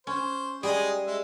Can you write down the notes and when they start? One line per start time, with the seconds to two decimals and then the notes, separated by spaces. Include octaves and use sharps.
0.07 C#4 C5
0.63 G3 G#3 G4 G#4 D#5
1.07 G#3 E5